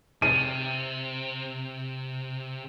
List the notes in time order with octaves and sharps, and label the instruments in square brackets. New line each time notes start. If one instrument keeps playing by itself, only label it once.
[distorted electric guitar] C3 [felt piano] D#7